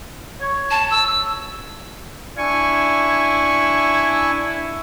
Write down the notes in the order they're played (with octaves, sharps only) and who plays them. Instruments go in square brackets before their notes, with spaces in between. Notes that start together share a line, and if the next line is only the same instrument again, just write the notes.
[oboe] C#5
[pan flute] A5
E6
[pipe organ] D4 G#5 C#6 [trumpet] E4